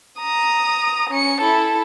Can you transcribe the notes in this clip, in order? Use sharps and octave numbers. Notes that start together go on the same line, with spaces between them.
A#5 D#6
C#4 C#7
E4 A4